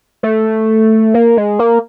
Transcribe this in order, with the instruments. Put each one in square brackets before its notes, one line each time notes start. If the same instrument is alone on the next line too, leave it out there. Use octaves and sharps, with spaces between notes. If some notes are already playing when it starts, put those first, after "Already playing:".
[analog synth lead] A3
A#3
G#3
A#3